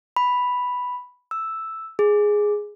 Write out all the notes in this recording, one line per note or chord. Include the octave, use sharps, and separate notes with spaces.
B5
E6
G#4